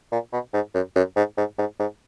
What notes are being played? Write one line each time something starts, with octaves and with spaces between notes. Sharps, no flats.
A#2
B2
G#2
F#2
F#2
G#2
G#2
G#2
G#2